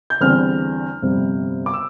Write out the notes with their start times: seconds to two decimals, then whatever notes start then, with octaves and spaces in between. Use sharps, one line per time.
0.10 G6
0.20 E2 D3 G3 C4 F6
1.02 G1 F2 C3 G3
1.66 D6
1.74 E6